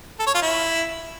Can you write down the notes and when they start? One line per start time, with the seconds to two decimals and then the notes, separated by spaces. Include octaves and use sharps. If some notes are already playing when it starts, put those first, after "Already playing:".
0.19 A4
0.27 C#5
0.34 F4
0.42 E4